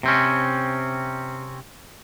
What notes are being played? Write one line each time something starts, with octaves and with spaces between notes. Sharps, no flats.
C3 C4 C#4